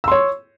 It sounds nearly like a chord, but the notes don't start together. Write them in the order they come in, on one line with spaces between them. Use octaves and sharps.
E6 C6 C#5